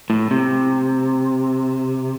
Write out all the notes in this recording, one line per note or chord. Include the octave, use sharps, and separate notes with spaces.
A2
C3